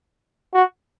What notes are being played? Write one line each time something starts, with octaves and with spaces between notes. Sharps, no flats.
F#4